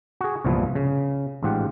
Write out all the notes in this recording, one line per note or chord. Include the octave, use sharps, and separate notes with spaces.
F#4 G#4
C2 G2 A#2 E3 F3 B3
C#3
A1 G#2 F4 G4 F#5